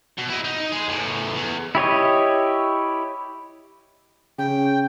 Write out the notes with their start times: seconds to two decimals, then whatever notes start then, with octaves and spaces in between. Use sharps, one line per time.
0.18 B2
0.29 E4 D#5
0.44 D#4
0.72 G#3 G#4
0.88 E2 A2
1.35 E2
1.75 E4 G4 C#5 D#5
4.38 C#3 G5